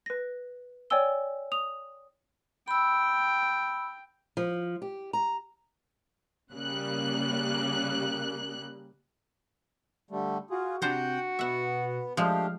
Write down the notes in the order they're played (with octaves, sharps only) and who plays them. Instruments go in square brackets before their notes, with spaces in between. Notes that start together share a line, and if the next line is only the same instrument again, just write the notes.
[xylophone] B4 A#6
C#5 D5 G5 G#5 E6 G7
D#6 F7
[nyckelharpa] G5 [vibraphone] B5 E6
[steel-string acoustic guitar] F3
G4
A#5
[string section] C#3 G3 A#3 F#6
[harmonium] D3 G3 A3
[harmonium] F4 G#4 [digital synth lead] F#4
[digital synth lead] C3 [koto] D4 C5 A#5 [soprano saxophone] F#4 [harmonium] F#5 G5
[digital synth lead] B2 [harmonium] B3 [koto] E5 F#5
[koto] F3 G#3 [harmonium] A3 D4 G4 [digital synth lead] F5